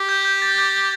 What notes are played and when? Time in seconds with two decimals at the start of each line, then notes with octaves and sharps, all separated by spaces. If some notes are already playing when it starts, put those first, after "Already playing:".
Already playing: G4
0.09 G6
0.25 G6
0.42 A6
0.58 G6